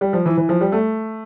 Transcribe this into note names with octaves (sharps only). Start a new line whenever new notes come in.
G3
F3
E3
E3
F3
G3
A3